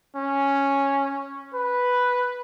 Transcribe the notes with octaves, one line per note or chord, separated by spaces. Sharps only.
C#4
B4